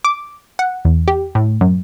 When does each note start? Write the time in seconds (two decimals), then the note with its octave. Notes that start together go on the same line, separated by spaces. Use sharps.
0.05 D6
0.59 F#5
0.85 E2
1.08 G4
1.35 A2
1.61 F#2